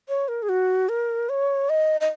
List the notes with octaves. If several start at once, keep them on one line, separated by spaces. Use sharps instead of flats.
C#5
A#4
G#4
F#4
A#4
C#5
D#5
D#5